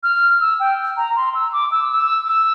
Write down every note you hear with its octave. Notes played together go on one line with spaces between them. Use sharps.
F6
E6
G5
A#5
C6
E6
D6
E6
E6
E6